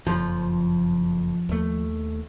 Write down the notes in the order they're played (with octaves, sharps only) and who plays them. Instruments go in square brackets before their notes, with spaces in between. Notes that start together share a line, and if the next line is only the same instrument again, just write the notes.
[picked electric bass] F#1 F2 [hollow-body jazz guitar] F3
[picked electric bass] D#2 A3